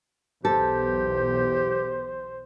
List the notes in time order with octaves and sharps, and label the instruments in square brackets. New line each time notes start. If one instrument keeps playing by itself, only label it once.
[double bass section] B1 E2 [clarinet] G4 [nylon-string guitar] A4 [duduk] C5